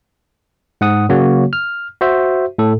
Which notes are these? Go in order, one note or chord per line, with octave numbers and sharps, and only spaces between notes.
G#2 F#5 D#6
C#3 F#3 A#3 F#4 C#5
F6
F#4 C5 E5
A2 A4